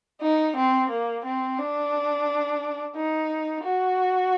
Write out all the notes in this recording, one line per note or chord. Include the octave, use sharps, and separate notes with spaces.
D#4
C4
A#3
C4
D4
D#4
F#4